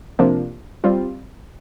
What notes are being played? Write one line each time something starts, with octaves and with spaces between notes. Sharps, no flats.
C3 F3 A#3 D4
G3 C4 F4